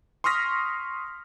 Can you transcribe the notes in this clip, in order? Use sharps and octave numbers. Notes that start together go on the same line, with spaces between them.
C6 C#6 D#6 F6 A#6 B6